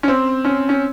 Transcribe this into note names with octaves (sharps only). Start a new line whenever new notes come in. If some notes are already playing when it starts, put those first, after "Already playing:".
C#4
C4
C#4
C#4